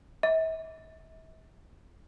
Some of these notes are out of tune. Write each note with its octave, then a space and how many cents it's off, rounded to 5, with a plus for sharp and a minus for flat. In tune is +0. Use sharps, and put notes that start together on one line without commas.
E5 -40